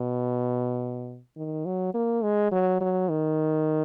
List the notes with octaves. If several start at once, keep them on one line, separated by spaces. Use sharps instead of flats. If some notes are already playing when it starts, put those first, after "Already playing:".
Already playing: B2
D#3
F#3
A#3
G#3
F#3
F#3
D#3